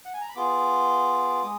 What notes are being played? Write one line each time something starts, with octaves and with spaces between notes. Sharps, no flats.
F#5
G#5
A#5
B5
B3 F4 G#4 D6
G#3 D#6